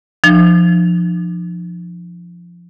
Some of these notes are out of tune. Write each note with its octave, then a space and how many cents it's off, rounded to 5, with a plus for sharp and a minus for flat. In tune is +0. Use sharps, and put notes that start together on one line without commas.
F3 -5 D#4 -45